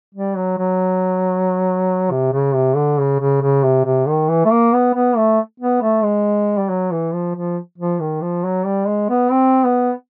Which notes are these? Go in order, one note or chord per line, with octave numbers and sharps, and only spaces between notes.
G3
F#3
F#3
C3
C#3
C3
D3
C#3
C#3
C#3
C3
C3
D#3
E3
A3
A#3
B3
B3
A3
B3
A3
G#3
G3
F#3
E3
F3
F3
F3
D#3
F3
F#3
G3
G#3
B3
C4
B3